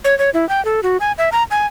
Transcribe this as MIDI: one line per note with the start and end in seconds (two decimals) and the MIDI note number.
0.04 0.17 73
0.19 0.30 73
0.34 0.47 64
0.49 0.63 79
0.65 0.80 69
0.83 0.97 66
1.00 1.12 80
1.18 1.29 76
1.32 1.43 82
1.51 1.66 80